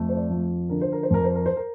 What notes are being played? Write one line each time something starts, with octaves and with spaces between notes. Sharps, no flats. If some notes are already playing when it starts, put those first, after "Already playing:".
Already playing: F2 A3
C5
D5
F3
D3 A#4
C5
A#4
C5
F2 A#4
C5
A#4
C5
A#4